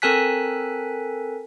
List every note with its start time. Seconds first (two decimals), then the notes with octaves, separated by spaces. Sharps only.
0.02 C4 A4 A#4 G#5 F#6 B6